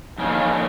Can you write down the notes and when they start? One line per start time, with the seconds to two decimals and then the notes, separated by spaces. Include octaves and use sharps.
0.18 F2 D#3 A#3 C#4
0.29 F5
0.40 C#5
0.51 C#5